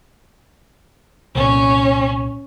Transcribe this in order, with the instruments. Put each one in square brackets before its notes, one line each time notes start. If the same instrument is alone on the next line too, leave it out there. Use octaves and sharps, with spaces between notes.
[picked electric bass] C2 A#2 [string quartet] C#4